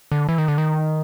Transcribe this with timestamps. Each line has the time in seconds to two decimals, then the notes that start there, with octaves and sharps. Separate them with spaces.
0.12 D3
0.29 E3
0.38 D#3
0.48 D3
0.58 D#3